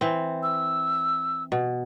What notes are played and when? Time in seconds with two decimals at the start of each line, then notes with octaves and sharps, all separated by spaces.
0.01 E3 C4
0.43 E6
1.52 B2